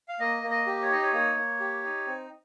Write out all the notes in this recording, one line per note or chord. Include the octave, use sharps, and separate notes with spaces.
F5
A#3 D#5
A#3
D#5
G4
C#5
D#4 D#5
C#5
A#3 C#5
A#3
G4
D#4
C4